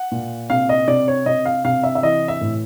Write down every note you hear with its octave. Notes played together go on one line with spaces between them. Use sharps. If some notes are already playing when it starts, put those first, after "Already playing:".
Already playing: F#5
A#2
C3 F5
D#5
C3 D5
C#5
C3 D#5
F5
C3 F5
E5
E5
E3 D#5
E5
A2